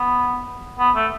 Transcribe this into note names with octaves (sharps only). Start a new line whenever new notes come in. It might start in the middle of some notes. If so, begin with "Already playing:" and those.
Already playing: B3
B3
A3